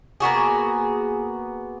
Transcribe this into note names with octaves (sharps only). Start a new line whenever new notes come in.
A#3 B3 F#4 G#4